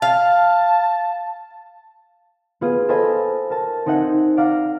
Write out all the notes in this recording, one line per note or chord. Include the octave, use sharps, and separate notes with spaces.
F5 A5
B3 F4 G#4
A4 C5 D#5 F5 G#5 B5
A#4 A5
C4 D#4 D#5 E5 F#5 G#5
D5 F5 F#5 A#5